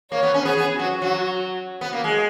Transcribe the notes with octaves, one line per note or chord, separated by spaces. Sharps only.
A#3 C#5
B3
C#4
B3 G#4
B3
F#3 F#4
F#3
B3
A#3
G#3